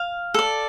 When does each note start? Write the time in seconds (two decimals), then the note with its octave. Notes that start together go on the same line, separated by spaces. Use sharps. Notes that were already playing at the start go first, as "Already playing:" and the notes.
Already playing: F5
0.34 A4 D5